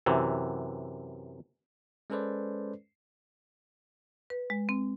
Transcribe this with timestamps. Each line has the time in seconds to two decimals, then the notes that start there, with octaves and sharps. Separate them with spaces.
0.06 F#2 C3 E3
2.10 G#3 C#4 A4 B4 C5 D5
4.30 B4
4.50 G#3
4.69 C4